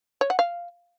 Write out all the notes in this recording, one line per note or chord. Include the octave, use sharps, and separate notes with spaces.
C#5
F#5
F5